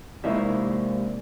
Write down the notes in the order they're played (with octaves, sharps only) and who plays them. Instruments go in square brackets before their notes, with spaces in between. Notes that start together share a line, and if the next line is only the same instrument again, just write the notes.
[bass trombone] C3 [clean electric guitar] G3 G#3 F5 [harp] A#3 [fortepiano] D#4 E4 E5